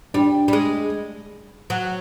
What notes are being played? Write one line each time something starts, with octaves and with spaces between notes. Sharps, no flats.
G3 D4
G3
G#3
F#3